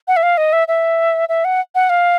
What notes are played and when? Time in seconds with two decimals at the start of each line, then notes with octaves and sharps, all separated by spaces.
0.08 F#5
0.17 E5
0.23 F5
0.37 D#5
0.53 E5
0.68 E5
1.29 E5
1.45 F#5
1.75 F#5
1.90 F5